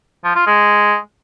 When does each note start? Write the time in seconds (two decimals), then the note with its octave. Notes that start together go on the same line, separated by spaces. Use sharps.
0.24 F3
0.36 F4
0.47 G#3